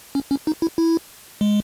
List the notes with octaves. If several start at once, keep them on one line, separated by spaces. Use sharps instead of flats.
C#4
C#4
D#4
E4
E4
G#3